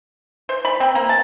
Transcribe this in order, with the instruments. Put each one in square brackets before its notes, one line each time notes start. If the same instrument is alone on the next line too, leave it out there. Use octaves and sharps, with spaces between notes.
[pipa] C5
B5
C4
A#3
A5